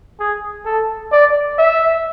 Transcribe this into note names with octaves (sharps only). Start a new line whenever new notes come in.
G#4
A4
D5
E5